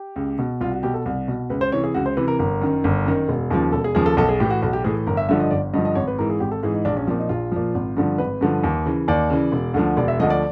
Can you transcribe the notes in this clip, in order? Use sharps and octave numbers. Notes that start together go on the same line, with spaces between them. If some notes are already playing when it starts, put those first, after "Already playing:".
Already playing: G4
C#2
B2
C2 F4
F#4
B2 G4
A4
C2
B2
C#2 B4
C5
C3 E3 C#5
G#4
C#2 F#4
C5
C3 E3 B4
A#4
G1 A#4
F#2 D#3
G1
F#2 D#3
E1
D#2 C#3 F3
E1 A4
G#4
D#2 C#3 F3 G#4
A4
B1 A4
G#4
A2 E3 G4
F#4
B1 F#4
G4
A2 E3 G#4
G1 A#4
E5
G2 D3 F3 E5
D#5
G1 D5
G2 D3 F3 D#5
D#5
G#1 C#5
B4
G#2 E3 A#4
G#4
G#1 G4
A4
G#2 E3 G#4
D#4
A#1 D4
C#4
A#2 F3 C4
D#4
A#1 F4
A#2 F3
G#1
G2 D3 F3
G#1 B4
G2 D3 F3
D#2
C#3 E3
D#2 D5
C#3 E3
E1
D2 D3 F3
E1 D5
E5
D2 D3 F3 D#5
D5